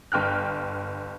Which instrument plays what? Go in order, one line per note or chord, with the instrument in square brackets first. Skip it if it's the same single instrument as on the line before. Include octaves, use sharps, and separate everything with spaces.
[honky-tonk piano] G1 G5 F6 F#6